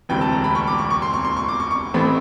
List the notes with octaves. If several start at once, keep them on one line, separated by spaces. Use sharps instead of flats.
E1 D2 C3 E3 G5
A5
A#5
B5
C#6
D6
C#6
C#6
C6
C#6
C6
C#6
D6
C#6
C#6
A1 A2 E3 A3 C4 B5